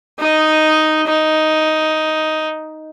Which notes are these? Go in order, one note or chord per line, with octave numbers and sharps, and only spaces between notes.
D#4 D#5
D#4